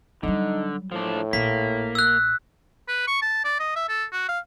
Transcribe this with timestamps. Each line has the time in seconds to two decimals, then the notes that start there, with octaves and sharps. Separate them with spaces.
0.23 D3 F#3 G3 D#4
0.92 A2 F3 D4
1.33 A#1 A#3 B6
1.95 E6 F#6
2.88 B4
3.08 C#6
3.22 A5
3.45 D5
3.59 D#5
3.76 E5
3.89 A4
4.12 F#4
4.29 F5